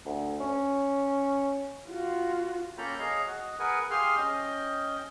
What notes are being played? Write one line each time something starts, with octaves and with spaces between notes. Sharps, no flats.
D2
C#4
F4 F#4
A#3 C#4 A4 G5 A#5 B5
G#4 C#5 D#5 F5 A#5
F#4 D#5
G#4 A#4 B4 F#5 G#5
G4 G#4 F5 G#5 C6 F6
C#4 D#5 G5